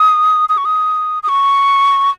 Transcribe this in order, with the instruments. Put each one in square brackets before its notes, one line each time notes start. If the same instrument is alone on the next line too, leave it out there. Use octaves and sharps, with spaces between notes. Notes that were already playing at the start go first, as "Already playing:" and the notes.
Already playing: [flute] D#6
D#6
C#6
D#6
D#6
C#6